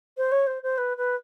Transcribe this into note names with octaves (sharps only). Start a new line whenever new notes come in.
C5
C#5
C5
C5
B4
B4